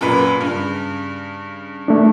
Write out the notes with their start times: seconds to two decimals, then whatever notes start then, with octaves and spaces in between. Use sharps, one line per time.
0.01 F#2 A#2 B4
0.41 G2 C#3
1.88 A3 D4